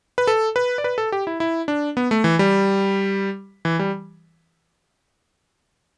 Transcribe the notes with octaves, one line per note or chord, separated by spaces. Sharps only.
B4
A4
B4
D5
B4
A4
G4
E4
E4
D4
B3
A3
E3
G3
E3
G3